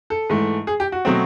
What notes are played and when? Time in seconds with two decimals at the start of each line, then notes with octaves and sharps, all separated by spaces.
0.10 A4
0.30 G#2 E3 A3
0.67 G#4
0.80 G4
0.92 F#4
1.05 B2 F#3 A3 C4